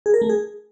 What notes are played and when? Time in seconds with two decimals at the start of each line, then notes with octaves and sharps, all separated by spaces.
0.06 G#4
0.14 A#4
0.22 A3
0.29 G#4